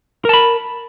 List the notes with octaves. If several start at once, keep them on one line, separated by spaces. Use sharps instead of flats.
A#4 A5 B5